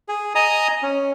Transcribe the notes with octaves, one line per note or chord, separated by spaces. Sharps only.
G#4
D#5 G#5 A#5 D#6
C#4